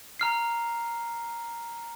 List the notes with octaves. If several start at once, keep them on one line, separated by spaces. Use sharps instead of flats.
A#5 F6 C7